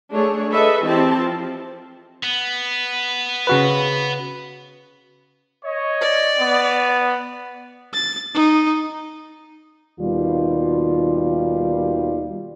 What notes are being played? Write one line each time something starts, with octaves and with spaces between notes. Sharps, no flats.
A3 D4 G#4 C#5
G#4 A4 B4 D#5 E5
E3 C4 G4 C5 A5
F3
B3
C#3 F#4 B4
C#5 D#5
D5
B3
A6
D#4
D#2 B2 D#3 G3 F4